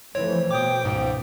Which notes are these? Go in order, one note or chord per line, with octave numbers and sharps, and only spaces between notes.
E3 F3 A3 C4 C#5
B2 G5 D6 D#6
C#2 G#2 B2 F3 G#3